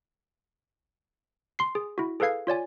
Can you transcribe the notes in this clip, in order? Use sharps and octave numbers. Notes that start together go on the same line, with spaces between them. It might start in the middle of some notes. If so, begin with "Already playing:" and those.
C6 C7
G#4
E4 F#4
G#4 A4 B4 F5 G#6 C7
F4 C#5 D5 G#5